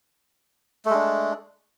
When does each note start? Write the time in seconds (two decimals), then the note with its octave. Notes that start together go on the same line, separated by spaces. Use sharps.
0.85 A3
0.90 G#3
0.94 D4